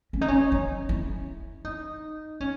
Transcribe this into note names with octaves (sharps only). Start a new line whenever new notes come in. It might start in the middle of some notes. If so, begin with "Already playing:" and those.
C#4
D#4
C#4
D#4
E4
D#4
C#4